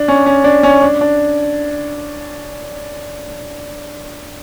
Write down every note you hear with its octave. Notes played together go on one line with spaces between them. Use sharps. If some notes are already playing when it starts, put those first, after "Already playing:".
Already playing: D4
C#4
C#4
D4
C#4
D4
D4